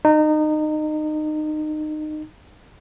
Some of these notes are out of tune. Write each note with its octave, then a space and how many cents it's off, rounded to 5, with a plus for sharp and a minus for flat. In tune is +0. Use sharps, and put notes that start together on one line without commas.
D#4 -25